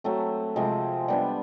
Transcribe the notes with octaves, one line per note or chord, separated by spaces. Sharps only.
F#3 A3 C4
C3 F3 G#3 C4
G3 B3 D4